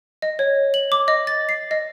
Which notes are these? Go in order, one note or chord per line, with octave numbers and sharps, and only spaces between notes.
D#5
C#5
F#7
D6
D#5
A6
C7
D#5